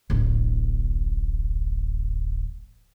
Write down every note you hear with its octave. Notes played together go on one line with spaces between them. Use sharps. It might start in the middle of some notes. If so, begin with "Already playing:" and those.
D1 A1